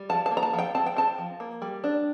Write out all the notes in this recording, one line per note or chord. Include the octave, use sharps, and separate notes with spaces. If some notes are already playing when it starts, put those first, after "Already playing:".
Already playing: G3
F3 A5
A5
A#3
A#5
A5
F3
G5
C4 A5
G5
C4 A5
F3
A#3
G3
D4